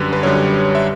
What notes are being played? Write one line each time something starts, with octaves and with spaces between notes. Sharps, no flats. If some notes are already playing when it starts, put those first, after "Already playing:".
Already playing: F#2 D3 G3 B4
B4
F#2 D3 G3 C#5
E5